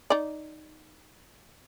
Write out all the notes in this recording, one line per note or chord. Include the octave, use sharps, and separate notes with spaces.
D#4 D5